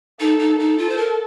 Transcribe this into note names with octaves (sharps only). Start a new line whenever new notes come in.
D#4 A4
D#4
D#4 A4
F4
C5
A#4